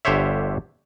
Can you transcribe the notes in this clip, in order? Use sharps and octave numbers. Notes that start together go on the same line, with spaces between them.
G1 D3 G4 C5 C#5 E5